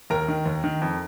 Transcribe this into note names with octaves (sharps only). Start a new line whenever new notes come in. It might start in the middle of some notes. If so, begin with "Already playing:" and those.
D#2 A#4 A#5
D#3
D#2
D#3
F2